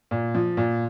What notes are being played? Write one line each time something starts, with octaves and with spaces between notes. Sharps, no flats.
A#2
F3
A#2